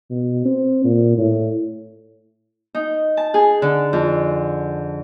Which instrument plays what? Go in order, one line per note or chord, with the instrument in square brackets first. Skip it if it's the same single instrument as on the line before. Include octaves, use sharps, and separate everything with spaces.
[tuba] B2
C4
A#2
A2
[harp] D#4
A5
G#4
D3
F2